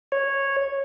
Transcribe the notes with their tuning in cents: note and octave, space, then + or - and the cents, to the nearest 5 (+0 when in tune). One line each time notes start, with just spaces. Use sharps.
C#5 -10